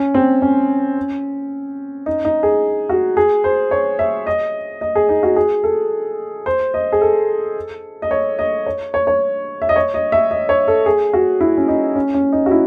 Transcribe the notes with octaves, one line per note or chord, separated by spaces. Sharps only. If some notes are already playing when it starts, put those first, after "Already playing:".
Already playing: C#4
C4
C#4
D#4
D#4
G#4
F#4
G#4
C5
C#5
E5
D#5
D#5
G#4
D#4
F#4
G#4
A4
C5
D#5
G#4
A4
D#5
C#5
D#5
C#5
C#5
C#5
E5
D#5
C#5
D#5
E5
D#5
C#5
A4
G#4
F#4
E4
C#4
D#4
C#4
C#4
D#4
F#4
E4